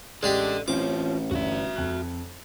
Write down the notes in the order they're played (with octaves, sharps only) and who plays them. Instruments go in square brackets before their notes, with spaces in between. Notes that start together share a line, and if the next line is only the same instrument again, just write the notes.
[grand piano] A1 [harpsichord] G#3 D4 G4 [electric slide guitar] A4 D5
[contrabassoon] A1 [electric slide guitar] E3 F4 [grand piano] C4 C#4 [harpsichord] D6
[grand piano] G1 D4 [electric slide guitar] F#4 E5
[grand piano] F2 F#6